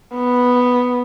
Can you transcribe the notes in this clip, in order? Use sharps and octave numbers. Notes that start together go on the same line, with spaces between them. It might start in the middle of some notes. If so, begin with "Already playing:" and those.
B3